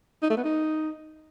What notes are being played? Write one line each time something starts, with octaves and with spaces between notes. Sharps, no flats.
D#4
A3
B3
D#4